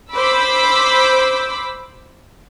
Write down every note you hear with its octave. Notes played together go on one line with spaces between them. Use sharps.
C5 B5 D6 E6